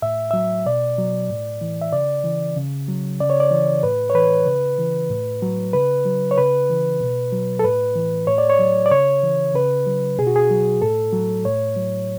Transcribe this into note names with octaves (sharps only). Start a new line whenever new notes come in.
A2 E5
F#3 E5
B2 D5
F#3
A2
E3
E5
C#3 D5
E3
C#3
F#3
C#3 D5
C#5
D5
E3
A2 B4
C#5
E3 B4
C#3
E3
A2
F#3
C#3 B4
F#3
C#5
C#3 B4
E3
B2
F#3
A4
A2 B4
E3
A2 C#5
D5
C#5
F#3
D5
C#3 C#5
E3
C#3 B4
F#3
B2 G#4
F#4
G#4
F#3
A2 A4
F#3
A2 C#5
F#3